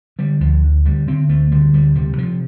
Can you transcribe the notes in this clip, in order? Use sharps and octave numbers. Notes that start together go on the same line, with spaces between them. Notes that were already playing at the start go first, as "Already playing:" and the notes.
D3 G3
D2 F3
D3
D3 G3
D3 C4
D2 A3
D3 G3
D2 G3
C3 G3
C3 F3